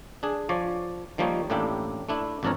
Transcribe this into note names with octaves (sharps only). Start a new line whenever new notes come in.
D4 G#4
F3 C#5 D5
D#3 F3 G3 A#3 D#4 C#5
A1 A2 A#3 D4 E4 G4
A3 D4 E4
G#1 F2 D4 A4 A#4 C#5